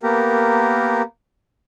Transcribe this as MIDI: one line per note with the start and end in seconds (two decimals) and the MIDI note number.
0.03 1.02 58
0.03 1.02 59
0.03 1.02 67
0.03 1.02 70